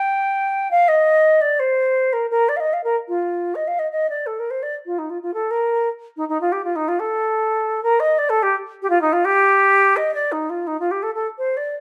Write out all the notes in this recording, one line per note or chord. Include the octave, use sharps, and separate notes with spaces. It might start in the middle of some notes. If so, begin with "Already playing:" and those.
Already playing: G5
F5
D#5
D5
C5
A#4
A#4
D5
F5
D#5
F5
A#4
F4
D#5
F5
D#5
D#5
D5
A4
A#4
C5
D5
F4
D#4
F4
F4
A4
A#4
D#4
D#4
F4
G4
F4
D#4
F4
A4
A#4
D#5
D5
A4
G4
G4
F4
D#4
F4
G4
D#5
D5
D#4
F4
D#4
F4
G4
A4
A4
C5
D5